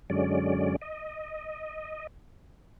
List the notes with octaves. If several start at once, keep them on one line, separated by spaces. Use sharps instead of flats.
F#2 D3 F#3 G#3 C#4 D5
D#5